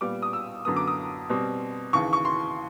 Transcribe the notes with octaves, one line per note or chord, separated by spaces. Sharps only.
A#2 G3 B3 D6
D#6
E6
F#2 D3 F#3 B3 D#6
D6
D#6
B2 G3 C4
D#2 C#3 E3 C#6
C#6
C6